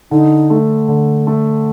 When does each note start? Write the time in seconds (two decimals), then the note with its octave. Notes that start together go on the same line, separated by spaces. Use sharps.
0.11 D3 D#4
0.50 A3
0.88 D3
1.27 A3